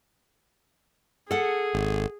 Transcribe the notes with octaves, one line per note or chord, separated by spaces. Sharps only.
G#4 A4 F#5
G#1